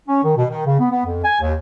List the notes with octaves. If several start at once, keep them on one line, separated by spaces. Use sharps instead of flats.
C#4
D#3
B2
D#3
C#3
B3
B3
F2
G#5
D#2